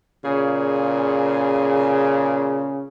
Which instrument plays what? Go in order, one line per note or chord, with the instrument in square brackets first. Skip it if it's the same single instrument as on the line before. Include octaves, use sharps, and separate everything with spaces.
[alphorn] A#2 [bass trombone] C#3 [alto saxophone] G#4